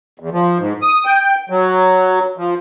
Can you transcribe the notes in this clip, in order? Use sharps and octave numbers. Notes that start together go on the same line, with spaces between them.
E2
F3
G#2
D#6
G5
F#3
F3